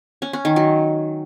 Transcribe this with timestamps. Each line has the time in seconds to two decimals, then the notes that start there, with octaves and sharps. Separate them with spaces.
0.22 C#4
0.33 C#4
0.45 D#3
0.56 F#3